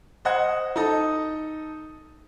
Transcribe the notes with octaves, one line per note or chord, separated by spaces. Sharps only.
C5 D#5 F#5 G#6
D#4 A4 D#5